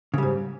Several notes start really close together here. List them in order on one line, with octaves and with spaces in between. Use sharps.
C#3 G3 G#2